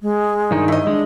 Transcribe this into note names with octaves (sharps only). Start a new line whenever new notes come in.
G#3
G2 D#3 D#4
E4 D#5
G#3 D4